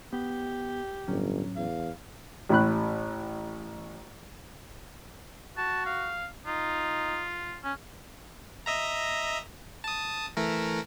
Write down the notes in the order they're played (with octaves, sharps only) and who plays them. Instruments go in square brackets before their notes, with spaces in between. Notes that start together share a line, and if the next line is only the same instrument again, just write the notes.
[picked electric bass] B3 [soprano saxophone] G4
[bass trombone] G1 [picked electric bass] A2 F#3 C#4
[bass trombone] E2 [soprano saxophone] F5
[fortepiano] A1 A2 B5 F#6
[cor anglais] F#4 [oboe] A5
[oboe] F5
[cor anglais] D#4 [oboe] F4
[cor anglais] C#4
[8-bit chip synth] D#5 E5 A#5
A5 D#6
E3 A3 A#4